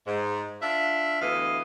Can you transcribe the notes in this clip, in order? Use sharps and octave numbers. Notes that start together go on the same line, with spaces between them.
G#2
D4 F4 E5
D2 E3 B3 D#5 F5